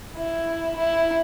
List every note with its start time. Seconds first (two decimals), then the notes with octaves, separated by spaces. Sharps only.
0.17 E4
0.76 E4